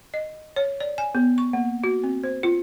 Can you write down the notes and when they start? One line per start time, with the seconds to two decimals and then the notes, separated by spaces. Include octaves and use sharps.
0.14 D#5
0.56 C#5
0.80 D5
0.98 G#5
1.15 B3
1.38 C#6
1.53 A#3
1.84 F#4
2.04 C4
2.24 C5
2.43 F4